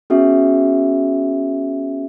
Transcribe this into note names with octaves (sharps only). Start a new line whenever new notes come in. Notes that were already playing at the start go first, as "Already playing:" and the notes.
B3 C#4 F#4 G#4 E5